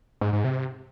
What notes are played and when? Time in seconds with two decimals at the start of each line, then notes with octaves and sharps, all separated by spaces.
0.21 G#2
0.33 G#2
0.44 C3